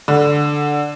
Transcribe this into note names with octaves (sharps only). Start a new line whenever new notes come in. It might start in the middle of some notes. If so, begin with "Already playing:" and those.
D3